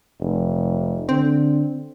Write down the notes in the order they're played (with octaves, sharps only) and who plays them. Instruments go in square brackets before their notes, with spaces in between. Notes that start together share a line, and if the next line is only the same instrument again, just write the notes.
[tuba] F1
[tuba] D3 [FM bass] C4